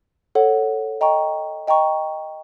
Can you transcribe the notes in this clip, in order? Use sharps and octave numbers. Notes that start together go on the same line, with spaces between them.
A4 C#5 F#5
D#5 G5 A#5 C#6
D#5 G5 A#5 C#6